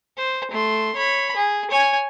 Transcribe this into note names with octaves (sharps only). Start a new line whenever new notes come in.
C5
A3 C6
C#5 B5
G#4
C#5 G#5